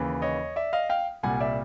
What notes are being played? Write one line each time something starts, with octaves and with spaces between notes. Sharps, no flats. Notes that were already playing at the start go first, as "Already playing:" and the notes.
Already playing: D#2 C#3 E3
C#5 D#5
D5 E5
D#5 F5
F5 G5
C2 A#2 G3 F#5 G#5
D5 E5